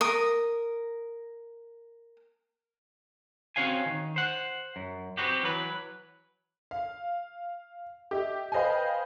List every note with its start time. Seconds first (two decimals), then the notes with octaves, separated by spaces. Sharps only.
0.01 A#4 D#6
3.56 C4 C#4 F#4 C#5 F5 G#5
3.86 D#3
4.16 C5 F#5
4.76 F#2
5.17 B3 C4 D#4 F#4 G4
5.43 E3 F#3 B4
6.71 F5
8.11 G4 D#5 E5
8.52 B4 C5 D#5 F5 G5 G#5